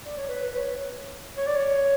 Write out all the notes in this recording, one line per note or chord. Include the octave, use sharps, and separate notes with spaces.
D5
C#5
B4
B4
C#5
C#5
D5
C#5